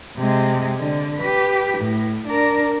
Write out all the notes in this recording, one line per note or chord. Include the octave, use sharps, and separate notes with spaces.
C3 G#3
D3
G4 B4
A2
D4 A#4